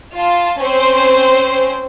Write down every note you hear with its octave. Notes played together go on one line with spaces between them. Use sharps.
F4 A5
C4 C#4 C5